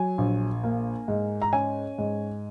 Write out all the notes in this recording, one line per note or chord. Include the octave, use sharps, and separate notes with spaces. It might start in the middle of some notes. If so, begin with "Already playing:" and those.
Already playing: F#3 G#5
A#1
A#3
G#2
A#5
C#4 G#5
G#2